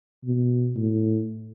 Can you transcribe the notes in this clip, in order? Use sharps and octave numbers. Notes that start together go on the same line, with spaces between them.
B2
A2